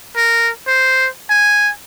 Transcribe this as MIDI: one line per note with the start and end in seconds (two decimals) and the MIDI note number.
0.17 0.50 70
0.67 1.08 72
1.30 1.71 80